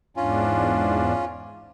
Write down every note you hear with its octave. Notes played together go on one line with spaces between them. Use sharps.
E2 G#2 C#4 D4 F4